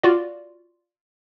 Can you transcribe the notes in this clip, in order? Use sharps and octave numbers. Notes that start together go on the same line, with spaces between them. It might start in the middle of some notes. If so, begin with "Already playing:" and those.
F4 F#4 D5